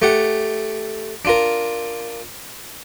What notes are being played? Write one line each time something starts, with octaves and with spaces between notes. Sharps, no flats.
A3 G4 F#5
D4 F4 A#4